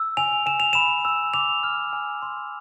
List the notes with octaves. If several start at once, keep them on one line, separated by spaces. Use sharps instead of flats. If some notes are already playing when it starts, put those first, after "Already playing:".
Already playing: E6
G#5 F7
G#5 E7
F7
B5 E7
E6
D6 F7
F6
G#5
C6